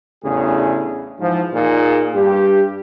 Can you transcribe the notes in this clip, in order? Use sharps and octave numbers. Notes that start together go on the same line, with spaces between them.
A1 E2 C#3 D4 G#4
G#2 E3 F3
A#2 D#4 G#4
G2 G4